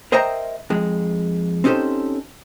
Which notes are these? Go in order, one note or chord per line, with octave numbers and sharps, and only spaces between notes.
A#4 C5 D#5 E5 G5 A#5
F2 G#3
C4 C#4 D#4 G4 A4 C5